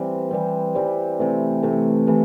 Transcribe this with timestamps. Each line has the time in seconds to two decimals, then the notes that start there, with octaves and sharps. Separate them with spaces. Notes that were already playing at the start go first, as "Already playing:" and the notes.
Already playing: E3 G3 C4
0.31 E3 G3 C4
0.75 E3 G3 C4
1.19 C3 E3 A3
1.63 C3 E3 A3
2.07 C3 E3 A3